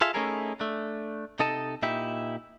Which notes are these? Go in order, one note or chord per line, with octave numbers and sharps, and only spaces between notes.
F4 G#4 A4 E5 F5
A3 C#4 D#4 E4 G#4 A#4
A3 D4
C3 D#4 A4 D#5 A5
A#2 D#4 E4 G4 E5